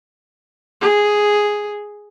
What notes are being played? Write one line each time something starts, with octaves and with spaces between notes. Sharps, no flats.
G#4